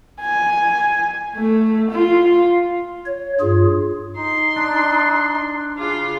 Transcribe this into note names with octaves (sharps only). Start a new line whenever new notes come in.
G#5
A3
F4
C#5
G2 F4 G#4
D#4 C6
D4 F#6
C#3 F4 D6